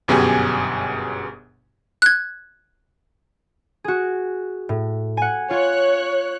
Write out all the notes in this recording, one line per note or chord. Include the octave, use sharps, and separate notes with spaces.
G1 F#2 B2 G4 G#4 G#5
F#6 G#6
F#4 G#4
A2
F#5 G#5
F4 C#5 F#6